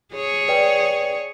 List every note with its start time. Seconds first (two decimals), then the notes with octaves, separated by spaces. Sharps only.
0.14 G#4 C#5
0.48 B4 D5 G5